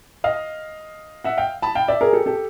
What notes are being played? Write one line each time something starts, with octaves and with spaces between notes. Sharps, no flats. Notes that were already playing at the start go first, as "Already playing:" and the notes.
D#5 F5
E5 F#5
F5 G5
A5 B5
F5 G5
D5 E5
G#4 A#4
G4 A4
G4 A4